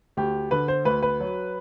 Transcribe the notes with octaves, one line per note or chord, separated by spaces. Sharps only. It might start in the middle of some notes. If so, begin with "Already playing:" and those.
D2 G4
D3 B4
C5
D2 B4
B4
F#3